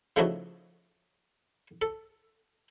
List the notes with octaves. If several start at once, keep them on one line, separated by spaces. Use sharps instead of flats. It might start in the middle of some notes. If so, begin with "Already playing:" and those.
C#3 F3 A3 D#4 E4 F#4
A4